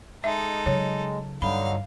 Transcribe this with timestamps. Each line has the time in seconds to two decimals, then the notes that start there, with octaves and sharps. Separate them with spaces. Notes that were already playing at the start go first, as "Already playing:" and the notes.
0.24 G#3 D#4 A4 E5
0.66 C#3 F#3 C#5
1.42 G2 D3 F#3 D#4 F5 B5